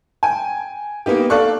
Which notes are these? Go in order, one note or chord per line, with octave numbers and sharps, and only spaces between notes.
G5 G#5
A#3 B3 D#4 G4
A4 D5 F5 C#6 F#6